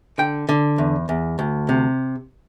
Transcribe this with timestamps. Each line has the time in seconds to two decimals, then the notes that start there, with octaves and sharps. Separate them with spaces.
0.18 D3 G5
0.49 D3
0.78 E2
1.09 E2
1.39 D2
1.69 C3